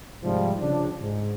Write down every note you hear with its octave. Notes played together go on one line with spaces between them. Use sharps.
G#2 C3 F3 G3
C#3 F3 D4
G#2